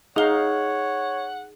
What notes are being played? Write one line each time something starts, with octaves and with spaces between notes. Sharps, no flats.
D#4 G#4 C#5 F5 F#5 G7